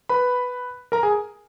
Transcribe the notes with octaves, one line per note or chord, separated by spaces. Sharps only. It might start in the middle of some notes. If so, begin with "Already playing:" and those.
B4 B5
A#4 A#5
G#4 G#5